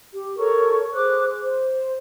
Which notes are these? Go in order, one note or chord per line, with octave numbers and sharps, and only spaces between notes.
G4
A4 A#4 C#5 C#6
G#4 C5 D6 F#6
C5